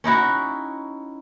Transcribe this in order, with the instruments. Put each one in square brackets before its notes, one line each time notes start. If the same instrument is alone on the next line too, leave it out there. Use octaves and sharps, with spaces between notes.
[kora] C#4 D#4 E4 F#4